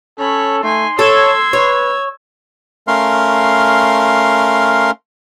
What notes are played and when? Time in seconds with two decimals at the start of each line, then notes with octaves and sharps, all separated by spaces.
0.19 C#4 A4 C#5 B5
0.63 A3 D#4 G#5 C6
0.99 A4 C#5 E6 G#6
1.53 B4 C#5
2.87 A3 C#4 A#4 F5 C6